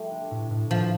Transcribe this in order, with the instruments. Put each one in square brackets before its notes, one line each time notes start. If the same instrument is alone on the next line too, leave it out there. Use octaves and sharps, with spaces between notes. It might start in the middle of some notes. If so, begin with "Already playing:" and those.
Already playing: [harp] G3 F4 [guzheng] A3
[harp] D4
A2
A2
[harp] A2 [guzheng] F3